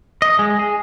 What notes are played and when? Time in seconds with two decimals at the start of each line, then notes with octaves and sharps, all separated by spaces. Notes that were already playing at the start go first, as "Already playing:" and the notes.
0.22 D#5
0.39 G#3
0.59 G#4